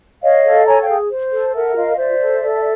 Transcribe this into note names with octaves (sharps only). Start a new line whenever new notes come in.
C#5 D#5 F5
A4
C#5 G#5 A#5
F5 G5
G#4
C5
A4
A#4 E5 F#5
F4 D#5 F5
C5 D5 E5
A4
A4